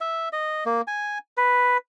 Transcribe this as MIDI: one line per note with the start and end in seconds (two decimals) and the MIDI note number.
0.01 0.29 76
0.33 0.64 75
0.66 0.81 58
0.87 1.18 80
1.37 1.77 71